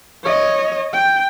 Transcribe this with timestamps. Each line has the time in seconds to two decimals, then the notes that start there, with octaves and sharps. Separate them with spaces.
0.24 C#5 D#5
0.93 G5